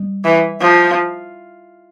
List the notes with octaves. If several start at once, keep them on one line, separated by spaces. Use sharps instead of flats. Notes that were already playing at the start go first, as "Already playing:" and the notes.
Already playing: G3
E3
F3